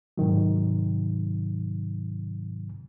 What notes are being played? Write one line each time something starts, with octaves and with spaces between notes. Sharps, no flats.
G#2 C3 D#3 F#3